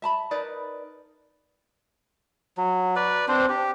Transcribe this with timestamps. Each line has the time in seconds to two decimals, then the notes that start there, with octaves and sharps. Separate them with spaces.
0.02 E5 A5 B5
0.31 D#4 A#4 B4 D5
2.57 F#3
2.96 B4 D5
3.28 C4 D4 C5
3.49 G4